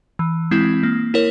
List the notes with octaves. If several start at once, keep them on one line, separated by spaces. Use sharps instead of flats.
E3
G#3 C4 E4
A#3
E4 A#4 C#5